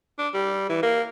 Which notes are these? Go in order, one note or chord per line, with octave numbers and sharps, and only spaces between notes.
D4
G3
E3
A#3